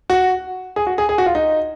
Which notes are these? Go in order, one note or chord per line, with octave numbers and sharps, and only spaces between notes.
F#4
G#4
F#4
G#4
G#4
F#4
F4
D#4